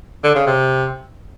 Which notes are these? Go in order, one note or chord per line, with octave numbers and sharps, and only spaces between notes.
D3
C#3
C3